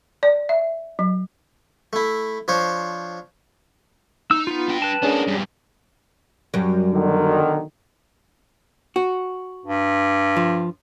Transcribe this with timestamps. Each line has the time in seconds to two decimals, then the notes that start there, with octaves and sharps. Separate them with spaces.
0.23 D5
0.49 E5
0.99 F#3
1.93 A3 E4
2.48 F3 D4 C5 C#5
4.31 D#4 E6
4.47 B3 F4
4.68 D4 G5
4.82 B4 A5
5.03 B3 C#4 D4 G#4 A#4
5.28 E2 G2
6.54 F#2 G3
6.93 B1 D3 D#3
8.96 F#4
9.66 G2
10.36 F3